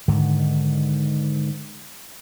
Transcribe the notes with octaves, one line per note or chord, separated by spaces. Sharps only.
G#2 D3 D#3